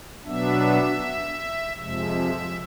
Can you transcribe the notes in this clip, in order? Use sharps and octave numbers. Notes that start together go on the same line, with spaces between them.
B2 F#3 B3 D4 E5
F2 C3 F3 G#3 E5